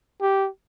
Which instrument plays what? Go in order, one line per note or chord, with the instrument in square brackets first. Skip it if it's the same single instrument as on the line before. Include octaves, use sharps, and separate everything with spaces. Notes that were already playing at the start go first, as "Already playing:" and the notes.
[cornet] G4